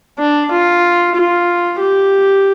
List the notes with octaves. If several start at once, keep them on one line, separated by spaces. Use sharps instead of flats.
D4
F4
F4
G4